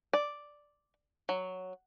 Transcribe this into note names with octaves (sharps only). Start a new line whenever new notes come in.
D5
F#3